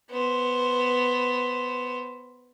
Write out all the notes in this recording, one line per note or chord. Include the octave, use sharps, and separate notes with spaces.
B3 C5